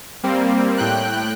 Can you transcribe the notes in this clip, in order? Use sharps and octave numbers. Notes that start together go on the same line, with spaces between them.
G3 A#3 C4
A2 G5 F#6